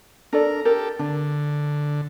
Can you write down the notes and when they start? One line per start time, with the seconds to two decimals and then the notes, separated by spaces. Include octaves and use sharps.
0.33 D4 A4 A#4 D5
0.65 G4 A4 A#4
0.99 D3 D4